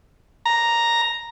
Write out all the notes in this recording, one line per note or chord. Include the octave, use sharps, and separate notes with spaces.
A#5